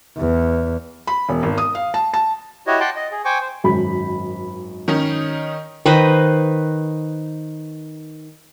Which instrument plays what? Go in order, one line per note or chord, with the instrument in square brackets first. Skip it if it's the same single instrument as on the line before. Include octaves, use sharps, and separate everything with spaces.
[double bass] E2
[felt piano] B5
E1
G#1
D#6
F5
A5
A5
[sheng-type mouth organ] E4 F#4 G4 C#5 D#5
F#5 G5 A5 C6 D6
D#5
G#4
C5 G5 G#5 C#6 D6
C5
[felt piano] G#1 F#2 B5
[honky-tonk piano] D#3 C#4 D#4
[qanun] D#3 B4 C5 D#5